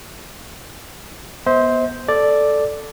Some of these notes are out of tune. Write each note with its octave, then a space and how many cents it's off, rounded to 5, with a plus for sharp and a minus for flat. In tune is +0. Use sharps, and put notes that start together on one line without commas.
B3 -15 C5 +0 E5 -45
A4 +0 D5 +0